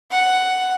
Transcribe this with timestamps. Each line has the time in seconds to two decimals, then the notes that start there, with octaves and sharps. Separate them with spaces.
0.11 F#5